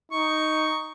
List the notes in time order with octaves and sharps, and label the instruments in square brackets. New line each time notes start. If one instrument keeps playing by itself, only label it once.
[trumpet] D#4 [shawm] C#6